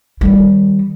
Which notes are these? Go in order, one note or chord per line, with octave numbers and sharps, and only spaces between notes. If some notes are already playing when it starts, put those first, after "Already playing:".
D#3 G3